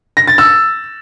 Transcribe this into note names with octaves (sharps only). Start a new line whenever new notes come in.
A#6
A6
E6